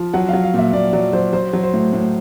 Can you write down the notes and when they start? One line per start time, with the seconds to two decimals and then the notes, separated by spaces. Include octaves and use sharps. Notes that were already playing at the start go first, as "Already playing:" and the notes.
Already playing: F3
0.13 F#3 F#5
0.29 F#3 F5
0.43 F5
0.54 A#2 E5
0.73 A#2 D5
0.93 F#3 D5
1.13 F#3 C5
1.33 F#3 C5
1.53 F#3
1.63 C5
1.73 A2
1.93 A2